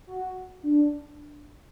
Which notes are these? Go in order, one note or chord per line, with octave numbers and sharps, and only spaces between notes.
F#4
D4